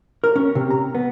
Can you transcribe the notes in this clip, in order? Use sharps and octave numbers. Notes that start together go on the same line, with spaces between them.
A#4
C#4
C3
A#5
B3